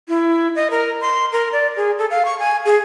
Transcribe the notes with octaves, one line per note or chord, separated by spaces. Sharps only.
E4
D#5
A#4
C6
A#4
D5
G#4
A4
F5
C#6
G#5
G#4